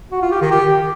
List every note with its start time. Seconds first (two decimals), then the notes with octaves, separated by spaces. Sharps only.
0.12 F#4
0.22 F4
0.31 G4
0.41 D#3
0.51 G4